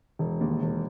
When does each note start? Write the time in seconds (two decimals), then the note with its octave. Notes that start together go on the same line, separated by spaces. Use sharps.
0.19 E1
0.41 D#2
0.62 E1